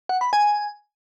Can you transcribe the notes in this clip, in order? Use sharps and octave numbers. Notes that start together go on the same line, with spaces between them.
F#5
B5
G#5